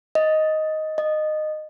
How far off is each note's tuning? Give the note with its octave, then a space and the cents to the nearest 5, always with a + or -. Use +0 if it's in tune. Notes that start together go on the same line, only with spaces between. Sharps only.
D#5 +5
D#5 -15